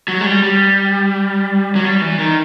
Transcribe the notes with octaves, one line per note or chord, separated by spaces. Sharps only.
F#3
G#3
G3
G3
F#3
G3
E3
D#3